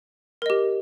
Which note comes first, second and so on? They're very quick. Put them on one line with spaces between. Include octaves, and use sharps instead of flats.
A#4 D#5 G4